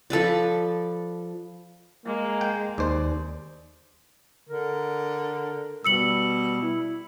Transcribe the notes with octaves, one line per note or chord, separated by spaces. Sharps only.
F3 A4 B4 D5
G#3 A#3
G5
D#2 C5 D5
D3 A#4
B2 G3 E6 C#7 F#7
E4